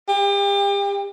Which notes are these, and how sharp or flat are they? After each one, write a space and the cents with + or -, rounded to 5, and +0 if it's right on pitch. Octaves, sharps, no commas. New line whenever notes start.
G4 +35